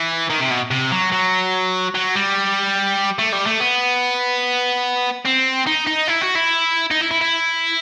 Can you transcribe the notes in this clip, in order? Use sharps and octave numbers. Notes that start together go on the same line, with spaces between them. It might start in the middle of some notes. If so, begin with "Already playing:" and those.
Already playing: E3
D#3
C3
B2
C3
F#3
F#3
F#3
G3
A3
G3
A3
B3
C4
D#4
D#4
E4
F#4
E4
D#4
E4
E4
E4